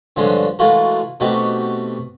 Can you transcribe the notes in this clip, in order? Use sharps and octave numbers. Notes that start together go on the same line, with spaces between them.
G2 D3 F3 G#3 C#4 C6
E3 G#3 A3 F4 F#4 A#4
B2 A3 C4 D#4 F#4 G4